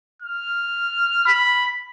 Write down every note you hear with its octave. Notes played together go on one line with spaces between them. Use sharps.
F6
B5